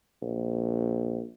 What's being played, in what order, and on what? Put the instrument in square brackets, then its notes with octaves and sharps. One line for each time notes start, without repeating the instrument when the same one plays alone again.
[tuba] A#1